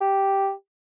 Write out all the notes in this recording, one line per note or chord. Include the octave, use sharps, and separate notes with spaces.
G4